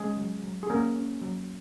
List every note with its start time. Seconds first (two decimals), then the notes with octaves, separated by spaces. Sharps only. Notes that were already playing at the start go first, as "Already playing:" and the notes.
Already playing: G#3 C#4 G#4
0.17 F#3
0.44 F#3
0.63 G#4
0.70 A#3 C#4 A#4
0.96 C#4
1.21 F#3